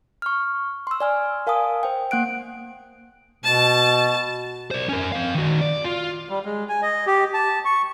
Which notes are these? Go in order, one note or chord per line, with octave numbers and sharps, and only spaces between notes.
C#6 F6
C6 E6
D5 G#5 F6
A#4 F5 G#5 A5 D#6
C5 G5
A#3 F#5 F#6 D7
B2 A5
C5 D5
C#4 A#4
C4 F5
D#3 F#4
D5
F4
G3
G#3
G#5
D#5
G4
A5
C#6